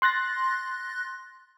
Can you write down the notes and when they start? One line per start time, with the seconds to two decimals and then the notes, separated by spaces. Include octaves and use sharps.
0.02 C6 F#6 A6 A#6